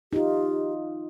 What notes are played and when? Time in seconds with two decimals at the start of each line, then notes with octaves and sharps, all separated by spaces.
0.13 D#4 F4 G4